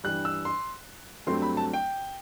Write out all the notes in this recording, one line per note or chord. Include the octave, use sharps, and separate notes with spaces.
G2 E3 G3 F#6
E6
C6
G2 F#3 A3 C4 C6
B5
A5
G5